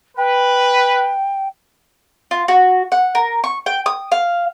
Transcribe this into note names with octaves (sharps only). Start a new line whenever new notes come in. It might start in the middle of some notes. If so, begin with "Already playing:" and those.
B4 G5
F4
F#4
F#5
A#4
C#6
G5
D#6
F5